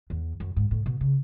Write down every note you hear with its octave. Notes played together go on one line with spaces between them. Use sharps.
E2
F#2
G#2
A2
B2
C#3